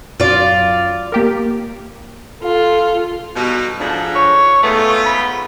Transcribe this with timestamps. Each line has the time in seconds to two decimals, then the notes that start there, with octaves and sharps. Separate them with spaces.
0.20 F#2 F#3 F4 D5
1.12 A#3 G4 A#4
2.41 F4 A4
3.35 B2 G3 D#4
3.80 G#2 F3 D4 A4
4.15 C#5
4.63 G#2 A3 B3 F4
5.05 B5